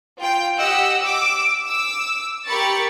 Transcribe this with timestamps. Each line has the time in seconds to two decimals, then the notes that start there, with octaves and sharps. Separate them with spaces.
0.18 F4 G5
0.58 G4 D#5 F#5 E6
1.02 D6 E6
1.63 D6 E6
2.46 G4 A#4 B5 C#6 A6 C#7